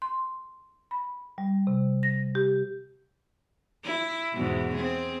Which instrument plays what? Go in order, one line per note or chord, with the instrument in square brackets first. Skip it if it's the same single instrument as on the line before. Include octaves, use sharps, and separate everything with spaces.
[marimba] C6
B5
G3
C3
A#6
G4
[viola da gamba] E4
E2 G#2 B2
C4 G#4